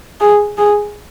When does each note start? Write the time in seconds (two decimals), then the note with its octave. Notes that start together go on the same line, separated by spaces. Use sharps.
0.21 G#4
0.58 G#4